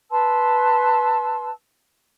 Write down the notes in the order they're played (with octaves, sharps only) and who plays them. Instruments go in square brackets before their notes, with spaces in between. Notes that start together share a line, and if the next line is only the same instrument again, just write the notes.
[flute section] B4 A5 C6 E6